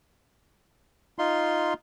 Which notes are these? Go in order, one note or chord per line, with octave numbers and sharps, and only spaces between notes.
D#4 F4 C6